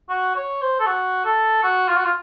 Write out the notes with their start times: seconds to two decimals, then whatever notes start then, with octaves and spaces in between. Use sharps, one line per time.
0.09 F#4
0.35 C#5
0.61 C5
0.80 A4
0.86 F#4
1.25 A4
1.63 F#4
1.88 F4
1.97 F#4
2.05 F4